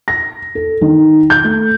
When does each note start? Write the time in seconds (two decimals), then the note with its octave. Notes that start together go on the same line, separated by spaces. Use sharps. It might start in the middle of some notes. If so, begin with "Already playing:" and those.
0.08 A#6
0.55 A4
0.81 D#3
1.30 G6
1.44 A3